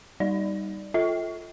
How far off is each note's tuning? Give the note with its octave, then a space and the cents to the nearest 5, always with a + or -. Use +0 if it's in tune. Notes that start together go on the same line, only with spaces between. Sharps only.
G3 +0 D#4 +0 D5 +0
F4 +0 A4 +0 E5 -45